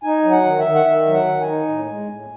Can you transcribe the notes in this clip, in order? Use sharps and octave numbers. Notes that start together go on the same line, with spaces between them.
D#4 G#5
F#3
F#5
D#3
E5
D#3
F#5
D#3 E5
F#3
F#5
D#3
G#5
D#4
A2
G#3
A2